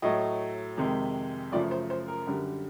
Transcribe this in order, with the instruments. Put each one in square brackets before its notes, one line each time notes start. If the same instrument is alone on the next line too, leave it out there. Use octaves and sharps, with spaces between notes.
[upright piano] A2 F#3 A3 D#5
F2 C3 D#3 G#3
F#2 C#3 F3 A3 D5
C5
C5
A#4
F#2 D3 G3